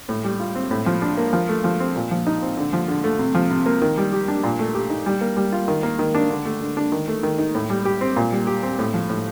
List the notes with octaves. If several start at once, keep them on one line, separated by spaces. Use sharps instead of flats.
A2
G3
F4
C4
A2
F3
D4
A#3
F3
A3
F3
C4
A#2
F3
D#4
C4
D3
F3
D3
A3
C3
F3
C3
A#3
D#3
G3
G4
D4
A#2
A3
G4
D#4
G3
A#3
G3
F4
D#3
A#3
D#3
D4
D3
A3
D3
D4
D#3
A3
D#3
D#4
A2
G3
G4
C4
A#2
G3
G4
C4
A2
F3
A2